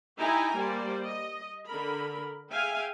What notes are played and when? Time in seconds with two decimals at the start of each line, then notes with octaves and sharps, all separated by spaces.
0.18 D#4 E4 G4 G5 G#5 A#5
0.56 G3 A#3 C5 D5
1.07 D#5
1.67 D3 A#4 B5
2.51 G#4 E5 F5 G5 G#5